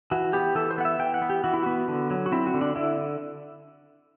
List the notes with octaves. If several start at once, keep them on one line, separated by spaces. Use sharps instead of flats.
E3 F#4
B3 G4
E3 A4
C5
B3 F#5
E5
E3 G5
F#5
B3
G4
E3 F#4
E4
B3 F#4
D3
F#3
F#4
C4 E4
F#4
D3
D4
D3 E4